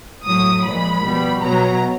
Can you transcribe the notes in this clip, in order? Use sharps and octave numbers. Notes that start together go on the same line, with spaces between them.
A2 F#3 D#6
A#2 F3 G#3 B5
B2 G3
B2 F#3 A#5